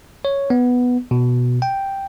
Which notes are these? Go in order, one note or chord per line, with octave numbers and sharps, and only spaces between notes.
C#5
B3
B2
G5